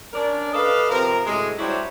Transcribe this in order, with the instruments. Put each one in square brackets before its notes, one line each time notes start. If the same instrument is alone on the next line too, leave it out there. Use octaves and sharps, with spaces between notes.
[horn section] C#4 D4 A#4 D5
A4 B4 D5 D#5 F5
C3 F3 A#4
F#2 A2 C3 G#3
F#3 G3 D4 E4 C5 C#5